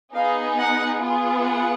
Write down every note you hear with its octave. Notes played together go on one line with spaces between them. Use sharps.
B3 D#4 G#4 F5
F#5
B3 F4 G#4
F#5